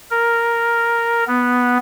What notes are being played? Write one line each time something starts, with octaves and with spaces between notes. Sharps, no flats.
A#4
B3